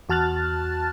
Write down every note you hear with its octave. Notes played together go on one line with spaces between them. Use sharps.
E2 F#4 A5 F6 F#6 A6